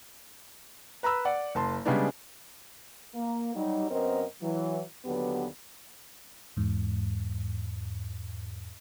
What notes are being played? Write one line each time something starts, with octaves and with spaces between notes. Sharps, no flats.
B4 A#5 B5 E6
D5 F#5
F#1 A5 C6
C#3 G3 G#3 B3 D4
A#3
F#3 G3 D#4
F#2 B3 C4 A#4 C5 D#5
E3 F#3
D#2 D3 F#3 B3 G4 B4
E2 G#2